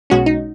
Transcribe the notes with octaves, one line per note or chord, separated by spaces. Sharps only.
B1 B2 G#3 C#4 F#4
D#4